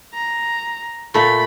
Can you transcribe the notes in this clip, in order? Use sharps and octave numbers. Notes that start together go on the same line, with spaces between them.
A#5
A#2 A3 B5